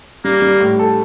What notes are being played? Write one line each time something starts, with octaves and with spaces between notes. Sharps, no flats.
G3 A#3
G3
A2
A4